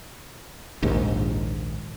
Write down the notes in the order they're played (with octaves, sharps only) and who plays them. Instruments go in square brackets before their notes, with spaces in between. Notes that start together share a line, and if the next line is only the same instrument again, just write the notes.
[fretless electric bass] A#1 D#2 G#2